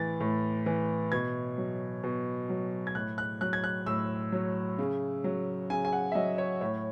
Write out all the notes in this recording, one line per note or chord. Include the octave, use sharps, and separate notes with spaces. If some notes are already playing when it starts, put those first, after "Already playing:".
Already playing: A2 E3 A6
A2
E3
B2 G#6
F#3
B2
F#3
G#6
A2 F#6
F#6
F#3 F#6
G#6
F#6
A2 E6
F#3
C#3
F#3
C#3 G#5
G#5
F#5
E5
F#3 D#5
C#5
A2 C#5